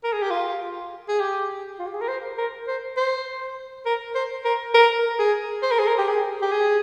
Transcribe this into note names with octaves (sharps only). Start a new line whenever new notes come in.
A#4
G#4
G4
F4
G#4
G4
F4
G4
G#4
A#4
C5
A#4
C5
C5
A#4
C5
A#4
A#4
G#4
C5
A#4
G#4
A#4
G4
G#4
G4
G#4